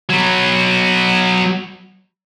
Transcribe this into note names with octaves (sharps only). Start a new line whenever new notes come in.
F#3 B3